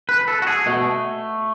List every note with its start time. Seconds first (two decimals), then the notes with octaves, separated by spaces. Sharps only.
0.09 B4
0.28 A4
0.42 F#4
0.47 G#4
0.66 B2 A3